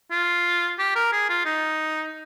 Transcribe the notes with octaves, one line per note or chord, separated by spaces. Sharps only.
F4
G4
A#4
G#4
F4
D#4